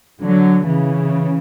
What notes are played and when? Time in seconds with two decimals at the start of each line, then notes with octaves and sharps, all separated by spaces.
0.22 D3 F#3
0.67 C#3 E3